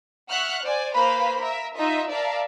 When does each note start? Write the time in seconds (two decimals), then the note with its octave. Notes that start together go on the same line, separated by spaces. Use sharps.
0.30 E5 F#5 C#6 F6 F#6
0.63 C5 D5 G#5
0.93 A#3 B4 C5 F5 B5
1.41 A#4 E5
1.76 D#4 F4 D#5 E5
2.10 A#4 D5 E5 F5 A5